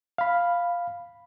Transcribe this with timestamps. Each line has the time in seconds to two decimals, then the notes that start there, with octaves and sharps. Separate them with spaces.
0.18 F5 B5